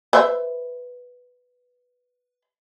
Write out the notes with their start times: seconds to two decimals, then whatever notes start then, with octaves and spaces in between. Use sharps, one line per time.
0.13 B4 C5 E5